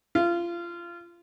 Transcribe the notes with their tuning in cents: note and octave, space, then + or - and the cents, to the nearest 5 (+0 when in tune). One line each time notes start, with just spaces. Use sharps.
F4 -25